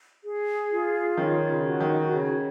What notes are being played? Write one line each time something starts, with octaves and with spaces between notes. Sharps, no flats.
G#4
F4
D#3 C#5
C#3
F#4
D#3
C#3 C#5